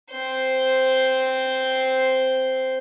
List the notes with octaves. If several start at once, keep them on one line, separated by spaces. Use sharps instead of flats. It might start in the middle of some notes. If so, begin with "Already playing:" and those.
C4 C5